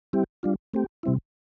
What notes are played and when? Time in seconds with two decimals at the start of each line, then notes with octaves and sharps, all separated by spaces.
0.13 G3 C4 E4 G4
0.43 G3 D4 F4
0.74 A3 C4 G4
1.03 C3 G3 C4 E4